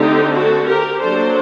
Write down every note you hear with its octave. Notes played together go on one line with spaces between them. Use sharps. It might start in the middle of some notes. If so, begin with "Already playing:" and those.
Already playing: D3 A3 C4 D#4 G4
F#4 A4
G4 A#4
F#3 A#3 D4 A4 C5